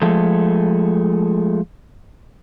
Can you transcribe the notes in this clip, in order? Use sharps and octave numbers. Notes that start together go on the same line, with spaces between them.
F3 G#3 A3 A4